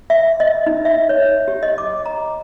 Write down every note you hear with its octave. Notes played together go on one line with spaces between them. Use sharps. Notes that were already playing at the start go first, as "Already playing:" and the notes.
E5
D#5
D#4
E5
C#5
G4
D#5
D6
A#5